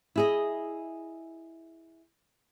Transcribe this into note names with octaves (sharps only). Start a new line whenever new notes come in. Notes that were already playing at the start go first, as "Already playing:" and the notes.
E4 G#4 D#5